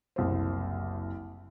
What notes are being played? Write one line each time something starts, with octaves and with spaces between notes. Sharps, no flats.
F#1 C2 C5